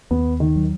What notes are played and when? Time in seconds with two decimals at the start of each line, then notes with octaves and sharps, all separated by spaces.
0.11 D#2 B3
0.40 D#3
0.56 F#3